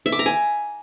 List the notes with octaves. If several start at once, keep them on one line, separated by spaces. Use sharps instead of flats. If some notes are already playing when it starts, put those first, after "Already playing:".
E5
D6
A#5
G#5